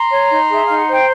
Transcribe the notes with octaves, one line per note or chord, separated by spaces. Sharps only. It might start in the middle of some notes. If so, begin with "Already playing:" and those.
Already playing: A#5 C6
C#5
D#4
G#4 E5
D#4 F5
F#5
C5
G5